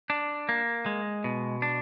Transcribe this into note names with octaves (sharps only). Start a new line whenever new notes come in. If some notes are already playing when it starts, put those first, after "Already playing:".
D4
A#3
G#3
B2
D4